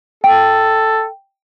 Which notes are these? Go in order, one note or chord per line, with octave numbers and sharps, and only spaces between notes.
A4 G5